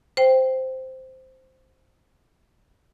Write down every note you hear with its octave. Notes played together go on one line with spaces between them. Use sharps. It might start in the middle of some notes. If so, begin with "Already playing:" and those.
C5 G5